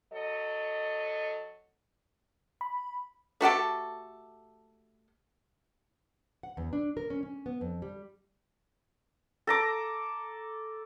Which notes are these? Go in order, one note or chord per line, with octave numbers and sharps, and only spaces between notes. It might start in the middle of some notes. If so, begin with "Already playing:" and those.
F#3 A4 D#5
B5
A3 F#4 G4 A4
F#5
E2
D4
A#4
C#4
C#4
B3
F2
G3
A4 A#5 D6